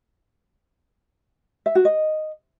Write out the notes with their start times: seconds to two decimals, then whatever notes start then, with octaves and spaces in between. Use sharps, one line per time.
1.66 E5
1.75 F#4
1.85 D#5